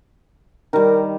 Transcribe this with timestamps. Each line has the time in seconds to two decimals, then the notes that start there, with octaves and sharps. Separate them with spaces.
0.73 D#3 G3 A#4